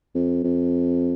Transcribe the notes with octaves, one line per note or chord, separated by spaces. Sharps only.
F2
F2